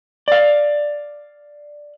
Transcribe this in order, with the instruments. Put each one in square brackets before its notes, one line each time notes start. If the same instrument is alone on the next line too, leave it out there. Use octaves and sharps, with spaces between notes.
[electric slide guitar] D5 F5